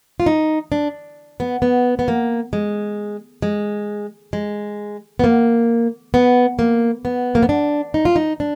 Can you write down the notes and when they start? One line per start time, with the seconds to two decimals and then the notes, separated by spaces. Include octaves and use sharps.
0.20 F4
0.26 D#4
0.72 D4
1.40 B3
1.62 B3
1.99 B3
2.08 A#3
2.53 G#3
3.42 G#3
4.33 G#3
5.19 B3
5.24 A#3
6.14 B3
6.59 A#3
7.05 B3
7.35 A#3
7.42 B3
7.49 D4
7.94 D#4
8.05 F4
8.16 D#4
8.40 D4